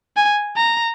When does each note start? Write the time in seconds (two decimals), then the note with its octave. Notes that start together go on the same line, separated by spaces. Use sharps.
0.17 G#5
0.56 A#5